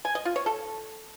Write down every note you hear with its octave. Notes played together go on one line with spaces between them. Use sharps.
G#5
D#5
F4
C#5
A4